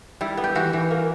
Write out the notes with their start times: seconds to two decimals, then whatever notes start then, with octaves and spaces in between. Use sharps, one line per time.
0.21 G3 E4
0.37 B3
0.44 G4
0.55 E3 F#4
0.73 E3
0.91 A#3